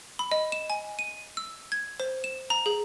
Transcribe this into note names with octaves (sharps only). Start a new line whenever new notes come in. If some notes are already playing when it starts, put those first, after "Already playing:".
B5
D#5
E7
G#5
D#7
E6
G#6
C5
E7
A#5
G#4